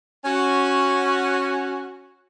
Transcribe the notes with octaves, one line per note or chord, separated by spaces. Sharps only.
C#4 F#4